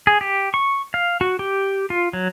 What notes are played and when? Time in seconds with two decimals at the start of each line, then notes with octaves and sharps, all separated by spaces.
0.07 G#4
0.21 G4
0.54 C#6
0.94 F5
1.21 F#4
1.39 G4
1.90 F4
2.13 F#3